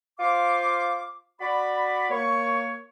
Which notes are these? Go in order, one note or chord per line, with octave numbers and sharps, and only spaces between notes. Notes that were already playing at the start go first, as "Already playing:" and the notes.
F4 C5 F5 C6 D6
F#4 D5 B5
A#3 C#5 C#6